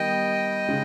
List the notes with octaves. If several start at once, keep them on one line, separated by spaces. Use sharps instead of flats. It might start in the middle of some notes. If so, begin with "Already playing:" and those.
Already playing: D#3 G3 B3 D#5 G5
C#3 G#3 D#4